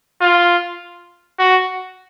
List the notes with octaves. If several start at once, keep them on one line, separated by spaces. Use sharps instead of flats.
F4
F#4